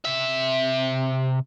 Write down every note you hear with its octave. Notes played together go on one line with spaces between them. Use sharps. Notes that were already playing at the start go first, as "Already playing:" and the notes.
C3 E5